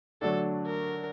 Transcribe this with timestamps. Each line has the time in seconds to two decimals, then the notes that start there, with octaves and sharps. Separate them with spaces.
0.22 D3 F#3 A3 D4 A4
0.66 A#4